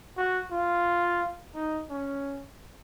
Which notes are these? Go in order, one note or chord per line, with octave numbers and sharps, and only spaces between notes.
F#4
F4
D#4
C#4